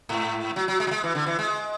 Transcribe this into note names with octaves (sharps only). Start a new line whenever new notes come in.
G#2
F#3
F#3
G#3
F#3
G#3
E3
D3
E3
G#3